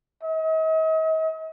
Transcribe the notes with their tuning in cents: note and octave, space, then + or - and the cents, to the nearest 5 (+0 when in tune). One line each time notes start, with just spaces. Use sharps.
D#5 +40